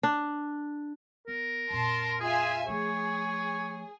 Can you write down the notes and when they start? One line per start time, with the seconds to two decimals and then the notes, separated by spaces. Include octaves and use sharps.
0.03 D4
1.28 B3 A#4
1.70 F2 A#2 A5 C6
2.21 F4 G#4 E5 G#5
2.68 F3 A3 G#4 C#5